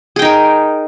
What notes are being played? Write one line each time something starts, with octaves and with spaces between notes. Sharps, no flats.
D#4 G#4 A#4 G5